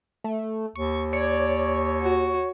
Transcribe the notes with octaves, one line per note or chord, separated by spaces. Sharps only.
A3
D#2 C#6
C#5 D5
F#4